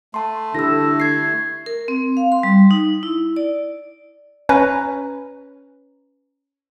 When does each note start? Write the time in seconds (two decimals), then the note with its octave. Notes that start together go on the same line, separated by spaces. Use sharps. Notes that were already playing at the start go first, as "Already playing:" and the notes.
0.14 A3 A5 C6
0.55 D3 E4 G4 A4 E6 A#6
1.00 G#6 C7
1.66 A#4
1.88 C4
2.17 F5
2.32 C6
2.43 G3
2.71 D#4
3.03 E4
3.36 D5
4.49 C#4 B4 C#5 A#5